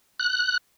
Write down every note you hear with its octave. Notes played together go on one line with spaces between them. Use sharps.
F#6